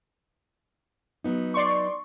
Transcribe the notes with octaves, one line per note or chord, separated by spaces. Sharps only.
F#3 B3 D#4
D5 C6 C#6